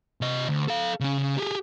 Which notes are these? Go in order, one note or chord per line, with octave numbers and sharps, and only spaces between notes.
C3 D#5
D2
A4 F5
C#3 C#4
G4 G#4